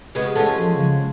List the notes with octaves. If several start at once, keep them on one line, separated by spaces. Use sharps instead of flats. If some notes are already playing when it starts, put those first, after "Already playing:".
C#3 G#3 B3 G4 D#5
G#3 C#4 F4 A4 F#5 A5 A6
F3
C#3